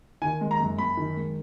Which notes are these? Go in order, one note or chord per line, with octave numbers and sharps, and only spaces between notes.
D#3 G#5
G#3
A#5
F#2
F#2 B5
D#3
G#3